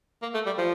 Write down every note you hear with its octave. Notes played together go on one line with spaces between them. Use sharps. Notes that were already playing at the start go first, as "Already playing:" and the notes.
A#3
A3
G3
F3